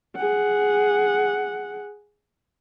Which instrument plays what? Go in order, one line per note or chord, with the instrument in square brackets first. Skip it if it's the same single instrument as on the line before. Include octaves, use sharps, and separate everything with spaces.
[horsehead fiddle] G#4 F#5